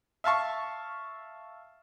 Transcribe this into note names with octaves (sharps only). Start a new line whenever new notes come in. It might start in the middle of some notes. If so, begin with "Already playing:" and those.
E5 F5 A5 C#6